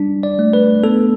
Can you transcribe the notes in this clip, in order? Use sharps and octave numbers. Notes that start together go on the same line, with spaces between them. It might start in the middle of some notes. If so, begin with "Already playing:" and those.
Already playing: G3 D4
D5
A3
B4
B3 A4